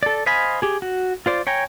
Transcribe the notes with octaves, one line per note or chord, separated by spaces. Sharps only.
A4 D5
C5 D#5 F5 G#5 B5
G4 G#4
F#4
F4 C5 D5
C#5 G5 G#5 A#5